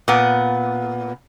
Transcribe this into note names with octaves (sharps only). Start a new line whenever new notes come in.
A#2 B3